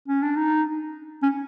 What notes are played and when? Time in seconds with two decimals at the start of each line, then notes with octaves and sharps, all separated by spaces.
0.08 C#4
0.23 D4
0.36 D#4
1.23 C#4